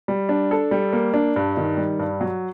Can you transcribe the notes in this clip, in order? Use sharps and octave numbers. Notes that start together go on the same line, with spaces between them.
G3
D4
A4
G3
A#3
D4
G2
D#3
G3
G2
F#3